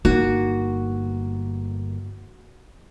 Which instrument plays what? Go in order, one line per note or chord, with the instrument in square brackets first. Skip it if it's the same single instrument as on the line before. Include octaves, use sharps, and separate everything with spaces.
[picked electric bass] G1 A#3 [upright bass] D#4 [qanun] F#4